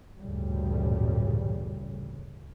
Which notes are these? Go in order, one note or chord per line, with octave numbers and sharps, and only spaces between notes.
A1 D2 G2 A#2 C#3 G3